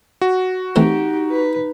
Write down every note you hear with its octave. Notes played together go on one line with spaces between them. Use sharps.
F#4
E3 A3 C4 D#4 G4
B4